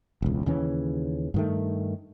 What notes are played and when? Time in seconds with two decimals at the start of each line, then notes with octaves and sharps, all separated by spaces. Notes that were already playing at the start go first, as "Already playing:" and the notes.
0.22 E1 C#2
0.46 D#2 C#3 E3 C#4
1.34 G2 D#3 A3